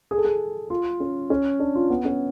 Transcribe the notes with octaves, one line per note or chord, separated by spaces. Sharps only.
G#4
A4
G#4
F4
C#4
C#4
D4
F4
B3
C#4